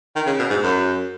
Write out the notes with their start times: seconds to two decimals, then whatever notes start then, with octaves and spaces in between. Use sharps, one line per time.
0.16 D#3
0.26 C#3
0.39 B2
0.50 G#2
0.63 F#2